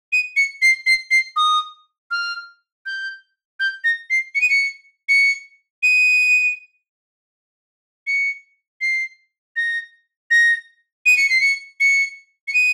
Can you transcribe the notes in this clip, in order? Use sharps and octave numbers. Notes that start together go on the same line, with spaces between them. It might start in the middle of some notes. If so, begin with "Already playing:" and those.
D#7
C#7
C7
C7
C7
D#6
F6
G6
G6
A#6
C7
C#7
D#7
C#7
C#7
D#7
C#7
C7
A#6
A#6
D#7
C#7
C7
C#7
C#7
C#7
D#7